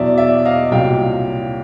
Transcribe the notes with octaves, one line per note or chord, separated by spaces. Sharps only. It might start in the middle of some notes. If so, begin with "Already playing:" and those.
Already playing: E2 B2 F#3 D5 E5
D5 E5
D#5 F5
C2 A#2 F#3 F5 G5